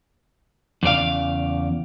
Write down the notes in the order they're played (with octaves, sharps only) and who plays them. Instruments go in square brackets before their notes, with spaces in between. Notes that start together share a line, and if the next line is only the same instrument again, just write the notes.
[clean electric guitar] E2 C#3 D5 F5